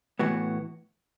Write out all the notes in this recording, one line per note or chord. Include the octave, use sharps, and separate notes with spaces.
A2 E3 B3 F#4